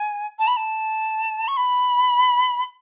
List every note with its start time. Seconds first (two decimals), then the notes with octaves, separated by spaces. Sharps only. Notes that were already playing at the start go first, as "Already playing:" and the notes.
Already playing: G#5
0.39 A5
0.48 B5
0.57 A5
1.48 C#6
1.57 B5